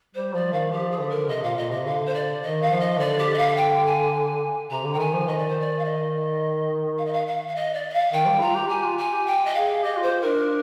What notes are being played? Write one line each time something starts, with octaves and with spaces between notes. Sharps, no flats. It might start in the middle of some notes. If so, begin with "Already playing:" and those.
G3 C5
F3 D5
D#3 F5
F3 G4
G#4
D3
A#4
C3 D#5
A#2 F5
A#2 D#5
C3 D#5
D3 F5
C5
D5
D#3 D#5
F5
F3
D#5
D3 D5
G4
D#5
F5
G5
G#5
C3 A#5
D3
G5
D#3 G#5
F3
D#3 D#5
D5
C5
D5
F5
D#5
F5
D#5
F5
F5
F5
D#5
D5
D#5
F5
D#3 G5
G3
F4 A#5
G4
G4 G#5
F4
G#5
G4
G5
D#5
G#4 F5
G4 D#5
F4
C5
F4
D4 A#4